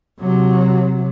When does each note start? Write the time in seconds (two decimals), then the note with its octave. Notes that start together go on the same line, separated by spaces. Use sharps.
0.20 C3 F#3